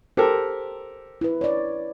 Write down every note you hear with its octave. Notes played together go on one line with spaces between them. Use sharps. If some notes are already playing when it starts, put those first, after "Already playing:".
G4 A4 A#4 C5
E4 B4
C#5 D5